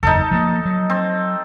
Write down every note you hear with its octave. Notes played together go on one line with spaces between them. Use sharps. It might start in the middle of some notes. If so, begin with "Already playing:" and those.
F#1 E2 D#4 A4
F3 F#3 A#3
F#3
C4